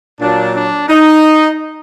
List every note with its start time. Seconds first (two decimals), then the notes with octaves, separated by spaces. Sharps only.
0.20 A#2 F#3 A#3 D4
0.54 D4
0.88 D#4